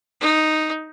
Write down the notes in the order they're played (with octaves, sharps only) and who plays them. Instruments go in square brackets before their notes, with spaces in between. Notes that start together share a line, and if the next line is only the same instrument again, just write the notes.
[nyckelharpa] D#4